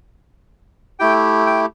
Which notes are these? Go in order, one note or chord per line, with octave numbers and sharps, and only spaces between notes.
A3 E4 G4 G5
G5